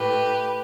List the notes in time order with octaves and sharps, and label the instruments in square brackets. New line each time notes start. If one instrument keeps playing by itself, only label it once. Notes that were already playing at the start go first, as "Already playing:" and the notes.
Already playing: [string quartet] A2 A3 G4 B4